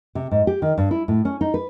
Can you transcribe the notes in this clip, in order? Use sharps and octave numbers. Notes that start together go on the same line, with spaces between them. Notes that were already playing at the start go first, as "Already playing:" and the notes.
C3
G#2
G4
D#3
G2
E4
A2
C#4
D#4
B4